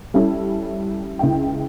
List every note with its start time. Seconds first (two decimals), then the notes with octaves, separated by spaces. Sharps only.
0.14 G3 C#4 E4 A4
1.19 C#2 E4 G5